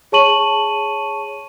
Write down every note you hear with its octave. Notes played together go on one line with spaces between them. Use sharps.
G#4 C#5 A5 C#6 D#7 F#7